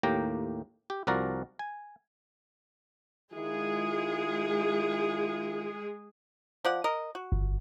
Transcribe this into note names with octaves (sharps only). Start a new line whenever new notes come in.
D#2 A2 A#3 G4 G5 A#5
G4
C2 F3 F#4 A#4 D5 A#5
G#5
D#3 G#3 E4 F4 G#4
F3 D5 F#5
A#4 D#5
F#4
G1